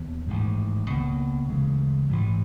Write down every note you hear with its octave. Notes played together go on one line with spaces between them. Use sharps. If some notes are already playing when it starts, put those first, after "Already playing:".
Already playing: D#2 B3
A1 G#2 D#3 G#3
C#2 B2 G3 A#3
D2 C#3 E3 G#3
A1 G#2 E3 G3